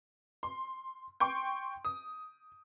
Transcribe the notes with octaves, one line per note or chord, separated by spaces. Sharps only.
C6
G5 C6 C#6
D#6